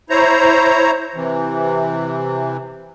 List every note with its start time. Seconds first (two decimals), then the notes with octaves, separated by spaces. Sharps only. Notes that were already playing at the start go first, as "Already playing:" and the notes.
0.10 E4 C5 C#5 A#5
1.15 C3 E3